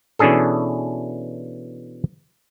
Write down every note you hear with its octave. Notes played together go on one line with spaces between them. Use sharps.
B2 E3 C#4 D4 G#4 A4